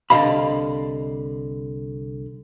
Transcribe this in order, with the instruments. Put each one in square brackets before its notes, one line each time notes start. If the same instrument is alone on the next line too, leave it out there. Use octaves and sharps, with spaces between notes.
[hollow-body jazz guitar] C2 D3 E3 D#5 F5 B5